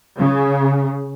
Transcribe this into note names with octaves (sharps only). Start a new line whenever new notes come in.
C#3